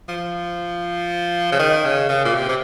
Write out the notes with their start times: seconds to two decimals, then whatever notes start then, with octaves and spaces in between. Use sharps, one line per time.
0.08 F3
1.52 C#3
1.59 D#3
1.85 C#3
2.09 C#3
2.25 A#2
2.35 C3
2.48 C3